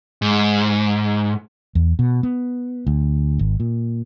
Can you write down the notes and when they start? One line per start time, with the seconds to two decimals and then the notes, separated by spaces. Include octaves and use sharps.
0.22 G#2
1.75 E2
1.99 B2
2.23 B3
2.87 D2
3.39 G#1
3.60 A#2